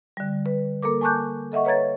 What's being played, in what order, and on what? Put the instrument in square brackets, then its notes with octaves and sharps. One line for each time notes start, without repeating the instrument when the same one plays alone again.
[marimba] D3 G3
B4
A#3 A4 A#4 D6
G#5 A5 C#6 D6 F#6 G6
A4 D#5 E5 F#5 C#6
B4 C#5 A#5 G#6 A6